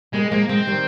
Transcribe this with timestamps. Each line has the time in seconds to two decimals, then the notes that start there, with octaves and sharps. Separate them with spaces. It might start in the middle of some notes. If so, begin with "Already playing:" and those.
0.13 G3 G#3 A#3
0.31 F3 G#3 A#3
0.49 F3 G#3 C4
0.67 D#3 G3